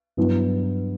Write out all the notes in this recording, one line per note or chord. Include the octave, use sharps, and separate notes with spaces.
G2 F#3 B3 E4